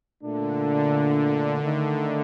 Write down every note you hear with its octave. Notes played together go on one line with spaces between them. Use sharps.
A#2 D3 A3 D4
D#3 A3 D#4